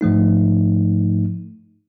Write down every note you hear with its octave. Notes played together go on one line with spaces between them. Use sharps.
G#2 F3 A3 D#4